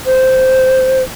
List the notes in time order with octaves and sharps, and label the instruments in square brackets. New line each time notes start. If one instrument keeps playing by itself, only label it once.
[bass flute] C5